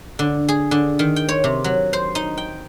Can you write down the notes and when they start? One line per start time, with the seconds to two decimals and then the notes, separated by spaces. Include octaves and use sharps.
0.19 D3
0.49 G#4
0.71 D3
0.99 D#3
1.16 G5
1.29 C#5
1.44 C3
1.64 F#3
1.93 C5
2.15 D#4
2.38 G5